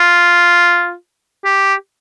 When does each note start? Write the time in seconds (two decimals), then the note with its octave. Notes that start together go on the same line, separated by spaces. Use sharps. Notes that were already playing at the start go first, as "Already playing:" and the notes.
Already playing: F4
1.45 G4